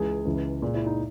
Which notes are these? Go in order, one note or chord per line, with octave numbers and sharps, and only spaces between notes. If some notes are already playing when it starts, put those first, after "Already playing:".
Already playing: C#2 C#3 E3 G#3 G#4
C#2 C#3 E3
A#2 G#3
E4
D#4